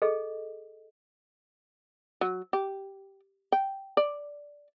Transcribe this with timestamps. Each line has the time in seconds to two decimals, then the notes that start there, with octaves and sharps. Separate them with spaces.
0.02 G#4 A4 D#5
2.21 F#3
2.53 G4
3.52 G5
3.97 D5